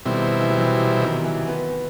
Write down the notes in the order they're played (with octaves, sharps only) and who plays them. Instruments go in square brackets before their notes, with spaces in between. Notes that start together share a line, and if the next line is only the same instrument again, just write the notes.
[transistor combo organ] B2 G3 C4 E4 [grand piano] D#3
[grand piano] E3
F#3
E3
C3
D#3
E3
B3